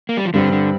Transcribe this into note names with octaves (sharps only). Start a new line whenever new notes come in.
A#3
G3
F3
G2 D3 G3 C4
D3